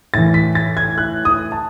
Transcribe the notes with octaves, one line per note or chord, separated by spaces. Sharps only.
A2 E3 A6
B6
A6
G#6
F#6
D#6
A5